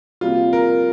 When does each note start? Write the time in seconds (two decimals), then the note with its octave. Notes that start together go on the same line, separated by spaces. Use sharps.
0.21 C3 G3 A#3 F4
0.53 A#4